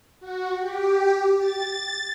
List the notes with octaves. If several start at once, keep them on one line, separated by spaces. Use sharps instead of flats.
F#4
G4
A6